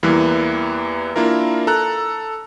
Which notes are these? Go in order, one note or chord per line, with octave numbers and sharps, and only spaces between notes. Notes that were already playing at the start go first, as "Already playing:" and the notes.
E2 E3 G3 A#3 E4 B4
A#3 D4 E4 F4 A#4
A4 A#5 F#6